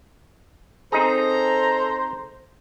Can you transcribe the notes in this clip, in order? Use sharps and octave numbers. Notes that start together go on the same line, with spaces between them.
C4 D#4 G#4 A4 C5 A#5